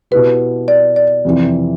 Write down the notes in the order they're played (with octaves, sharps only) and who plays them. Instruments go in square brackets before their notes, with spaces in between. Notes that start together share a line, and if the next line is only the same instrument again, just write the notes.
[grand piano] B2 B3 E4 G4 [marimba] B4
[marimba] D5
D5
[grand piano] F2 C3 E3